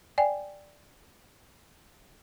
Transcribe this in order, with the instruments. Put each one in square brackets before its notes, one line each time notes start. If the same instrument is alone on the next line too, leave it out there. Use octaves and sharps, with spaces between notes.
[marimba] D5 G5 G#5